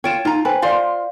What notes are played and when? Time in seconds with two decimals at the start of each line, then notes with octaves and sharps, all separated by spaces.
0.04 F4 C#5 G5 D7 E7
0.25 D#4 F4 A#5
0.45 B4 C5 G5 G#5
0.62 F4 C5 D5 F5